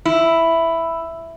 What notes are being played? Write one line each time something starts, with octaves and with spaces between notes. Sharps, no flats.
E4